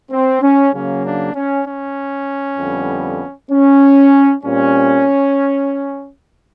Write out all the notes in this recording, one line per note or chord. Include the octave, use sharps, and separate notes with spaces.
C4
C#4
C#3 F#3 A#3 C#4
D4
C#4
C#4
F2 D3 G3 B3
C#4
A#2 G3 C4 C#4